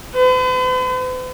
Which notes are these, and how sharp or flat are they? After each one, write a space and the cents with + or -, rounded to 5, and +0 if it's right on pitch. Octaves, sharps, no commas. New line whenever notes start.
B4 +45